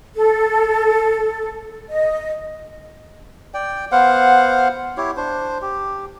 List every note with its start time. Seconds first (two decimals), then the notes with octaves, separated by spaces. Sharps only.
0.15 A4
1.89 D#5
3.54 D5 G5
3.92 B3 C5 F5 F#5
4.97 E4 G4 C#5
5.17 D4 C5
5.62 G4